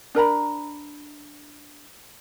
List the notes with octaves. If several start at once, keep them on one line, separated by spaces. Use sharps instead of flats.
D4 A#4 A#5 B5